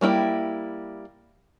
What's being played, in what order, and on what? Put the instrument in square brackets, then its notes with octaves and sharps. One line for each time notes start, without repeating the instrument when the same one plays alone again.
[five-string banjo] G3 A#3 E4 G5